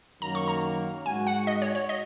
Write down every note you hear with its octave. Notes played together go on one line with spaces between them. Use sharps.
F#2 D#3 F#3 A#3 A#5
C#6
A#5
G#2 G#3 F#4 G#5
F#5
D#5
C#5
C#5
D#5